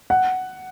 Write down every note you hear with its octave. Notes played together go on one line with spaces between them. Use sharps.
F#5